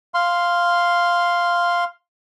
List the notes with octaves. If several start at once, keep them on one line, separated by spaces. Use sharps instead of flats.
F5 C6